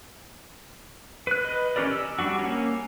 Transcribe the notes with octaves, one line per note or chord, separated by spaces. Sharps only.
B4 F#6
B4 D#5
E3 C#4 G4 A#4 D5
E6
G3 D4 F#4
A#3 C#4